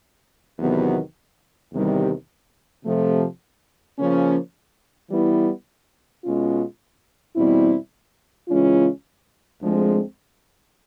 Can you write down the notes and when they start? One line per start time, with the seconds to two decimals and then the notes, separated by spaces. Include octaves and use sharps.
0.59 E2 C3 D#3 F#3 B3
1.72 E2 C3 D#3 G3
2.85 C3 F3 A3
3.98 C#3 F3 A#3 C#4
5.10 E3 G3 B3 E4
6.24 B2 G#3 C#4 F4
7.36 E2 B2 G3 C4 E4
8.48 C#3 E3 G#3 C#4 F4
9.62 D2 D3 F3 G#3 C4